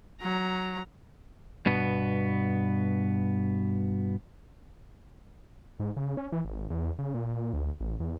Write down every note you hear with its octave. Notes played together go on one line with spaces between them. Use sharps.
F#3 A#5
G2 B2 B3
G#2
C#3
C#4
E3
G#1
E2
C#3
A#2
D2
A1
E2